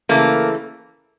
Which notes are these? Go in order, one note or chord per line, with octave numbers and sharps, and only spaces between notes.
C#3 E3 A3 A#3